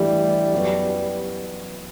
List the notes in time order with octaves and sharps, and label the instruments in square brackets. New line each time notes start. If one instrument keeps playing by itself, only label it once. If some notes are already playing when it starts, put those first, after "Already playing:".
Already playing: [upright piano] A1 G2 E3 A3 E4 [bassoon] G3
[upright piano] F#2 F#3 B3 F#4